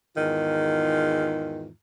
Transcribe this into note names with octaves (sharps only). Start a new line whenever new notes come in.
E2 G#2 D#3 F4